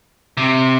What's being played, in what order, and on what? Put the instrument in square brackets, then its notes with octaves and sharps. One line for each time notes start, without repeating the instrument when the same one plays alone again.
[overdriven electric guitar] C3